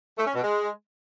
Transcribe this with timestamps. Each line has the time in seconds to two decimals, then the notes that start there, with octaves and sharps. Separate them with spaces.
0.17 A3
0.26 C#4
0.35 B2
0.43 G#3